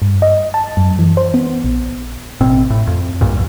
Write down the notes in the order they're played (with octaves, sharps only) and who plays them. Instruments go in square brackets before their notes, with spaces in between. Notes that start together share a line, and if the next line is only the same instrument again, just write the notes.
[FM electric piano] G2
D#5
A5
F#2
E3
C5
B3
A#1
[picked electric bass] A1 B2 C4
A2
F2
B1 G2 A#2
B1 E2